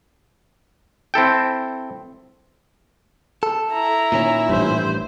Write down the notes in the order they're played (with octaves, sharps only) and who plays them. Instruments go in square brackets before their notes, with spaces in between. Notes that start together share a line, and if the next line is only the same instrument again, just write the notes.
[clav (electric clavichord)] C4 E4 A4 G5
[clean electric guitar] A4
[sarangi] E4 [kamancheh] A#5
[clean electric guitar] A#2 D#3 C#4
[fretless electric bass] A1 G2 [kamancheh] C5